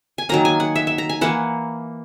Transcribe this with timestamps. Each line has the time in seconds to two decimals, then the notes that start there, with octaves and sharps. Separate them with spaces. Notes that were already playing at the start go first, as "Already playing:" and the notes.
0.18 G#5
0.29 D#3 F#3 A#3 A#5
0.45 G#5
0.60 F#5
0.76 E5
0.87 E5
0.98 A#5
1.09 G#5
1.21 E3 A#3 F#5